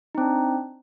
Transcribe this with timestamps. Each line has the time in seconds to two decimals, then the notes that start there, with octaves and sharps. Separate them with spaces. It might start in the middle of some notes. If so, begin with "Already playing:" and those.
0.15 D#4
0.18 C4
0.21 D4